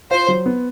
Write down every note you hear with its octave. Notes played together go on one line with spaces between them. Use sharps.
F4 C5
F#3
B3